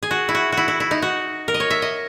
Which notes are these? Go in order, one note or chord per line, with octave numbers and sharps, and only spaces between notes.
G#4
F#4
E4
F#4
E4 F#4
E4
E4
D#4
F#4
A#4
D#5
C#5
E5
D#5